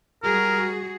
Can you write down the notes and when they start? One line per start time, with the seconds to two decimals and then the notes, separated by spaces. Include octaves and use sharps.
0.23 G3 F#4 G#4 A#4